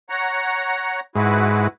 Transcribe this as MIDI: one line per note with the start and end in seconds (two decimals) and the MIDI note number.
0.10 1.00 73
0.10 1.00 78
0.10 1.00 82
1.15 1.67 44
1.15 1.68 64
1.15 1.68 66
1.15 1.68 71